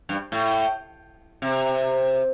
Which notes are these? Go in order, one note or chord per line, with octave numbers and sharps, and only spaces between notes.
G2
A2
C3